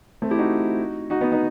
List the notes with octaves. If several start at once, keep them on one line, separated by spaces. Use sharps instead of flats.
A3 C4
E4 G4
D#4 F#4
D#4 F#4
B3 D#4
B3 D#4